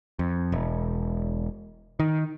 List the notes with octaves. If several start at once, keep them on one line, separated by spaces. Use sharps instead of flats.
F2
E1
D#3